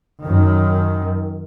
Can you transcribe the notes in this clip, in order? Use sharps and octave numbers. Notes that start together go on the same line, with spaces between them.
F#2 D#3